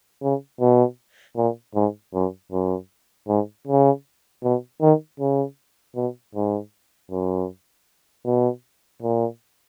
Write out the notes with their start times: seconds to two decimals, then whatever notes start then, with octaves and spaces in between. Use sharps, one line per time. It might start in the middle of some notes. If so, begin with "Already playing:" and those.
0.22 C#3
0.61 B2
1.37 A#2
1.75 G#2
2.14 F#2
2.52 F#2
3.28 G#2
3.67 C#3
4.44 B2
4.81 D#3
5.20 C#3
5.96 B2
6.35 G#2
7.11 F#2
8.25 B2
9.02 A#2